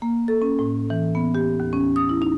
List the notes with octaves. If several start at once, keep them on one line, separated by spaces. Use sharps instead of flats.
A#3
A4
C#4
A2
E3
B3
G4
D#2
C#4
D#6
E4
D#4